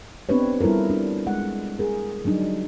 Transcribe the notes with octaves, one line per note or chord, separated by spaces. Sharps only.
B3 C4 D4 G4 B4 C#5
G3 E4 F4 A4 A#4
D4
G#3 F#5
G#4 A#4
F#3 G3 D4 D#4